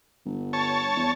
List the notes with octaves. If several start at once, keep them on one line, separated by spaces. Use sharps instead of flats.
G1
C#5 A5
E2